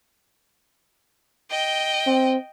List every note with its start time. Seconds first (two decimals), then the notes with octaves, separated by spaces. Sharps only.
1.51 D#5 G5
2.07 C4